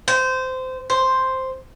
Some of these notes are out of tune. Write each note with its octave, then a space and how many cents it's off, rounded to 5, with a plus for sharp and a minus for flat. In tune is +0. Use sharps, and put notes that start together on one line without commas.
C5 -20
C5 +0